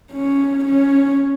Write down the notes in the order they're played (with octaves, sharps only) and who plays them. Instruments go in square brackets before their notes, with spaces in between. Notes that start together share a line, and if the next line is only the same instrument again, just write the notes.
[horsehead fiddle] C#4
C#4